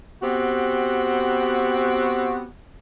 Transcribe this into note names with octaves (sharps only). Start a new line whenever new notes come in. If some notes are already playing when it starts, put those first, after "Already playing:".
B3 C4 F#4 G4